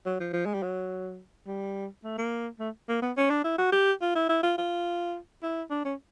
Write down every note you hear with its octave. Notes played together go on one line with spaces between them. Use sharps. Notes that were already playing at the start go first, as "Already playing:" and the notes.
F#3
F3
F3
G#3
G3
F#3
G3
A3
A#3
A3
A#3
B3
C#4
D4
E4
F#4
G4
F4
E4
E4
F4
F4
E4
D4
C#4